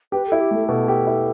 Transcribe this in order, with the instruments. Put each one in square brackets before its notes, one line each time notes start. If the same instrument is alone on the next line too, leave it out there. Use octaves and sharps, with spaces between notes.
[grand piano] G4 [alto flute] B4
[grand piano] E4 [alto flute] A4
[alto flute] G4
[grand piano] A3 [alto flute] A4
[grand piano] B2 [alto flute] A4
[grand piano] G4
E4